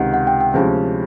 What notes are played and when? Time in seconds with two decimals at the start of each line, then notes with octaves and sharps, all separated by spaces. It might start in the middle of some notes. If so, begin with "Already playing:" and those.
Already playing: C#2 C3 D#3 F#5
0.14 F#5
0.27 G5
0.41 G5
0.54 D2 C3 F3 G#3 C#4